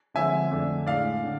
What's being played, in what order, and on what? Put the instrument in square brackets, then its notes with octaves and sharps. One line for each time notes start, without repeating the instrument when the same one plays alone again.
[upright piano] D3 F3 G#3 C4 E5 G#5
F2 D3 A3 D4
A2 G#3 D4 D5 F5
D3